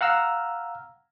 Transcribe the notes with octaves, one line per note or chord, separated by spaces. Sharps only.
F5 F#5 A#5 E6 F6